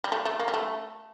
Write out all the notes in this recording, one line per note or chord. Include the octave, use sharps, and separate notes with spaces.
G3
A3
A3
A#3
G3
A3